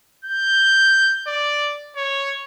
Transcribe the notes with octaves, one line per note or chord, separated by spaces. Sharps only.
G6
D5
C#5